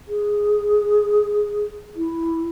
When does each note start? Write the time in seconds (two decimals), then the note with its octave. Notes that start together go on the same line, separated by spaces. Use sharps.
0.08 G#4
1.96 E4